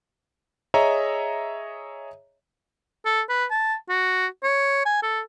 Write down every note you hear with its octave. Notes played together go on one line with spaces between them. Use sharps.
G#4 C#5 D#5 E5 A#5
A4
B4
A5
F#4
C#5
G#5
A4